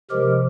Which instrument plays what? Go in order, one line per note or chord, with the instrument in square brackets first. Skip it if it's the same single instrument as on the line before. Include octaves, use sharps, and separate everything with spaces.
[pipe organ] C3 F3 G#3 G4 A#4